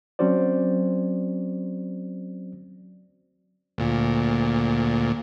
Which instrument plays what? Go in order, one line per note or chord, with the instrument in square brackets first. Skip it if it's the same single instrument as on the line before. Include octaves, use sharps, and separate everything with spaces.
[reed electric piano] F#3 C4 C#4 F#4 C5 D5
[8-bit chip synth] D2 A#2